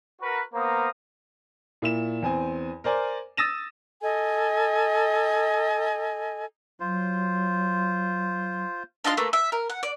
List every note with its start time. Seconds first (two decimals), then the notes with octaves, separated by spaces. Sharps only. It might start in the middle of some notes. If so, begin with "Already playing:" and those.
0.21 F#4 A#4 B4
0.54 A#3 B3 C5 F5 A#5 D#6
1.82 A#2 E4 E7
2.22 E2 C4 G#5
2.84 A#4 C5 D5 G#5
3.37 D#6 E6 A6 A#6 D#7 E7
4.02 A4 D#5 G#5
6.80 F#3 F4 C5
9.04 D4 D#4 F4 C6
9.17 A3 A#3 B4
9.33 E5
9.52 A#4
9.70 F#5
9.83 D5